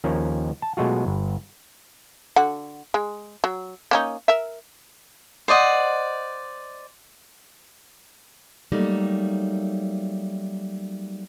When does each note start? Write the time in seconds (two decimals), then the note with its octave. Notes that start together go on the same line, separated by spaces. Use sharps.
0.04 D#2 F3 A#3 C#4
0.62 A5
0.77 B2 F#3 G#3 A3 F4 F#4
1.06 G1
2.36 D3 F#4 F#5
2.94 G#3
3.44 F#3
3.91 A#3 C#4 D#4
4.28 A#4 E5
5.48 C5 D5 D#5 F#5
8.72 F#3 G3 A3 A#3 D#4